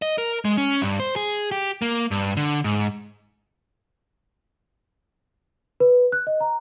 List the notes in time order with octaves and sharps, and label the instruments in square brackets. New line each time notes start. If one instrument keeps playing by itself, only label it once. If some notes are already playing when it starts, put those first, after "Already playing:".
[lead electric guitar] D#5
A#4
G#3
C#4
G2
C5
G#4
G4
A#3
G2
D3
G#2
[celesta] B4
F#6
D#5
A#5